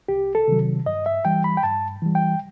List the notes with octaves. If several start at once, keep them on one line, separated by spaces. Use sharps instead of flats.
C2 G4
A4
C3 D#3 F#3
G2 D#5
E5
E3 G3 G5
B5
G5
G2 A5
E3 G3
G5